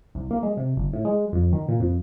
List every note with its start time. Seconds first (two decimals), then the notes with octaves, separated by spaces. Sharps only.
0.15 C2
0.31 A#3
0.43 G#3
0.57 C3
0.76 G1
0.93 A2
1.05 G#3
1.32 F2
1.53 D#3
1.68 A#2
1.80 F2